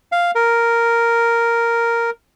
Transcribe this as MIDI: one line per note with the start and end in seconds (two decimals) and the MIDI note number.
0.12 0.31 77
0.35 2.10 70